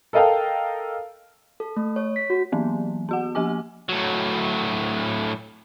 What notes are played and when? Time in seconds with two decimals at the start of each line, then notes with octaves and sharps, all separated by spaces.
0.13 A4 A#4 D#5 F5 G5 A5
1.60 A4
1.77 A3
1.96 C#5
2.16 B6
2.30 F#4
2.52 E3 F#3 A#3 B3
3.09 B3 F#4 F#5
3.35 F3 A#3 G4 G#5 D6
3.89 A2 F#3